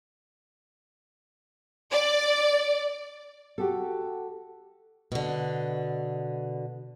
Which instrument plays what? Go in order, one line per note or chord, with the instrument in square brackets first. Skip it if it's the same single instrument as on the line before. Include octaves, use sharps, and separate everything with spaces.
[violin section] D5
[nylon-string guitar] F#4 G4 A4
[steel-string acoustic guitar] B2 D3